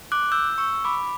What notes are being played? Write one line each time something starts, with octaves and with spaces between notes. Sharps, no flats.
D6 F#6
E6 G6
C#6 E6
B5 D6